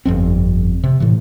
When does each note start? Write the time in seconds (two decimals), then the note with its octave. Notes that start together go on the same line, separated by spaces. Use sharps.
0.05 G1 F2 C4
0.84 C3
1.00 A2 E3